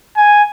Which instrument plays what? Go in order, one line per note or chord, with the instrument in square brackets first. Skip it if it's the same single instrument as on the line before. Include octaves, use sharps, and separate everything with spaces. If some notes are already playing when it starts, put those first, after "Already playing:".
[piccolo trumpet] G#5